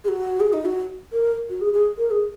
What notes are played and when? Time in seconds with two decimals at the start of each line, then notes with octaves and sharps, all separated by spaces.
0.04 G#4
0.08 F#4
0.40 G#4
0.53 D#4
0.65 F#4
1.12 A#4
1.50 F#4
1.61 G#4
1.73 G#4
1.98 A#4
2.11 G#4